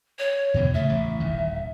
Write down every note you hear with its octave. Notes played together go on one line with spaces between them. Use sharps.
C#5
E2 B2 D3
C#3 A3 E5
A1
D#1 D#3